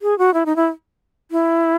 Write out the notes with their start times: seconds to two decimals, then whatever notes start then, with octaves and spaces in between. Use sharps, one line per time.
0.02 G#4
0.19 F#4
0.34 E4
0.46 D#4
0.56 E4
1.31 E4